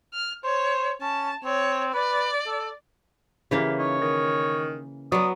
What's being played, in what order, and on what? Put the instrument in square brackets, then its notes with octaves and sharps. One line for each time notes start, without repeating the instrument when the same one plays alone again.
[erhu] F6
[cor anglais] C5 [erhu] C#5
[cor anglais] C#4 [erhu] A5
[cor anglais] C4 [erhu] C#5
[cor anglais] B4 [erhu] D5
[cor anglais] A4
[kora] C#3 E3 A#3 [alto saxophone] G4
[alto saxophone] D#4 [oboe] C#5
[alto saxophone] D#3
[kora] F#3 B3 [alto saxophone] D5 [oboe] D#6